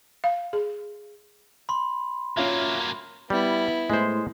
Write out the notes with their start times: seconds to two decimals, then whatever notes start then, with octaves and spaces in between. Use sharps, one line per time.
0.24 F5
0.53 G#4
1.69 B5 C6
2.37 F#3 A#3 C#4 F4 E5
3.30 G3 B3 E4
3.90 A2 G#3 C5